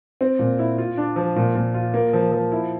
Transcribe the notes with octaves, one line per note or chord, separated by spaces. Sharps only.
C4
A#2
E4
F4
D4
F3
A#2
A#2
F4
A#3
F3
F3
E4